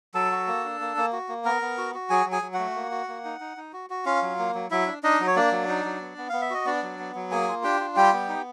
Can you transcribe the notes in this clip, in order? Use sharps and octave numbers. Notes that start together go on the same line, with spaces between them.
F#3 A4 A5
F#4
A#3
D4
A#3
A#3
F#4
A#3
B3 A#4 A#5
B3
F#4
F#4
F#3 G#4 G#5
F#3
G#4 G#5
F#3
F#4 F#5
A3
A#3
F#4
A#3
D#4
D#4
D#4
F#4
F#4
C#4 F4 F5
F#3
A#3
F#3
F#3 E4 E5
D4
D4 D#4 D#5
F#3
C#5
A#3 D4 D5
F#3
D#4
F#3
B3
B3
B3 F5
E5
F#4 D#5
B3 D4 D5
F#3
B3
F#3
A#3 G#4 G#5
F4
D4 G4 G5
F4
G3 G4 G5
B3
D#4